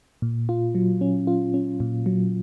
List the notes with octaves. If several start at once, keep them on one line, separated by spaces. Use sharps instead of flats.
A#2
F4
F#3
C#4
F4
C#4
A#2
F#3